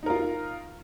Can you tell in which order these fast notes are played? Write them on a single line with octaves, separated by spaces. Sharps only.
D#4 A#4 F4